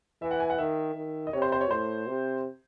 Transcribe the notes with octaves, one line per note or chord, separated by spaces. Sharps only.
E3 E5
F#5
G#5
F#5
D#3 E5
D#3
D#5
C3 C#5
C5
C5
C#5
A2 C5
C3